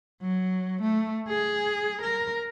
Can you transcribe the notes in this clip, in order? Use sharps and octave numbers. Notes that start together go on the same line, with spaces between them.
F#3
A3
G#4
A#4